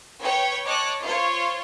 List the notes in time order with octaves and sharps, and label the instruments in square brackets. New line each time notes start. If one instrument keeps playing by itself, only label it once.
[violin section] B4 C#5 G5
C#5 D#5 A5 D6 F#6
F4 C5 C#5